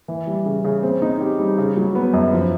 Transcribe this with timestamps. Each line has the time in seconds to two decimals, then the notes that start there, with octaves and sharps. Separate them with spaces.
0.08 E3
0.27 G3
0.46 C#3
0.64 C#3
0.83 C4
1.02 D#4
1.20 G4
1.39 G3
1.58 C#3
1.77 F#3
1.95 B3
2.14 F#2
2.33 F3